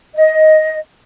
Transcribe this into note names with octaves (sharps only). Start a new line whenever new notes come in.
D#5